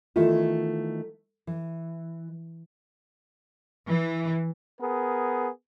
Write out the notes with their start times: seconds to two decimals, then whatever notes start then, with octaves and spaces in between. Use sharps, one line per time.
0.16 D#3 E3 A3 B3 E4 F4
1.47 E3
3.89 E3
4.81 B3 G#4 A#4